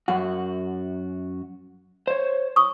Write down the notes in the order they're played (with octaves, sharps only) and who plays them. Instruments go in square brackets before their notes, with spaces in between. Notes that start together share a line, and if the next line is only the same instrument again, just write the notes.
[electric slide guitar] F#2 F#4 [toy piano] F#5
[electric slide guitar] C5 C#5
[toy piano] C#6 D#6